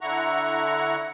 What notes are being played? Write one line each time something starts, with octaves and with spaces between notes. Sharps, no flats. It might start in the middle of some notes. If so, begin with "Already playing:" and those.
D3 E4 F#5 A#5 C#6